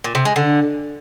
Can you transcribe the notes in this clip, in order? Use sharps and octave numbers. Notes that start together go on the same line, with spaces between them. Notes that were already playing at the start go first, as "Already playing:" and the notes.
A#2
C3
G#3
D3